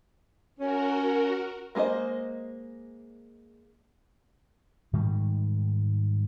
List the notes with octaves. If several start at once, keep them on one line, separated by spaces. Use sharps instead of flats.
C#4 F#4 A#4
G#3 A#3 G#4 C5 D#5
G#2 D#3 G3 G#3